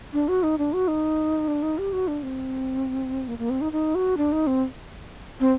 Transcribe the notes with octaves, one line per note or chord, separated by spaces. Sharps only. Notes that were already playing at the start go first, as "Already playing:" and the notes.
D4
F#4
D#4
D4
F#4
D#4
D4
D#4
G4
F#4
D4
C4
A#3
A#3
C4
D#4
D#4
F#4
D4
D#4
C4
C4